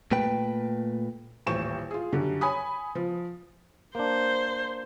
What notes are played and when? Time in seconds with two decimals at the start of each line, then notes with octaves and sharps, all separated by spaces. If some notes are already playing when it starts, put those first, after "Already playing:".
0.12 A#2 A3 B4 G5
1.46 D#1 A1 C5 C#6 E7
1.91 F4 G#4
2.12 F#2 D3 G3
2.41 C#5 G#5 B5 D#6
2.95 F3
3.95 A#3 D4 C5